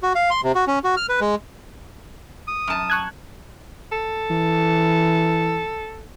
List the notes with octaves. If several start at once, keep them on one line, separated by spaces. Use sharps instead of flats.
F#4
F5
C6
C3
F#4
C#4
F#4
F6
B4
G#3
D#6
F#2 A5
C#6 F#6 G#6
A4
E3